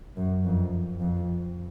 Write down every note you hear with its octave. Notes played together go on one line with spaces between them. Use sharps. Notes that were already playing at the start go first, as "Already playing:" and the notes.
F#2
F2
F2